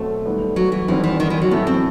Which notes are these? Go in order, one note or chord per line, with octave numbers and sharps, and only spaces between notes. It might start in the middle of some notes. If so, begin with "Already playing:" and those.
Already playing: B2 F#3 A3 C4
D#2 D#3 G3 B3
F#3
E3
E2 D#3 E3 G3 C4
E3
D#3
E3
F#3
A2 E3 A3 B3 E4
C4